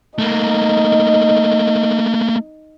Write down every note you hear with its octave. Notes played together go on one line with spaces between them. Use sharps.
A3 A#3 D#4